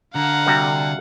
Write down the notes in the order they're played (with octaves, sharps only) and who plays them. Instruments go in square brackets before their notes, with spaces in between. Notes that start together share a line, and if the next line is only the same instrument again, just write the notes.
[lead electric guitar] D3 [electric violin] F5 F#5 [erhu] A#5
[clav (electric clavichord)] C3 G3 F#4